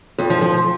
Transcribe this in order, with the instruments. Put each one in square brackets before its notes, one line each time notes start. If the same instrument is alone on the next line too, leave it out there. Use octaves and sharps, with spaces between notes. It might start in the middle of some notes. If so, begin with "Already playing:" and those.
[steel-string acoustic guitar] F2
F3
F3